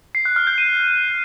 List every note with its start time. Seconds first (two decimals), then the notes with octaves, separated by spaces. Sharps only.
0.15 C7
0.25 F#6
0.36 F6
0.47 G6
0.58 D#7